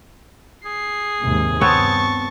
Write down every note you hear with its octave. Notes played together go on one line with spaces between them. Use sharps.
G#4 C7
D#2 G#2 C3
G2 B3 C4 C#5 A5 C#6